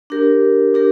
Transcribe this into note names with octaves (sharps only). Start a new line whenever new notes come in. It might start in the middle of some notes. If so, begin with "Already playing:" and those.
D4 G4 A#4
D4 G4 A#4